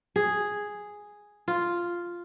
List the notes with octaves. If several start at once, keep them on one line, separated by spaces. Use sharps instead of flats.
G#4
F4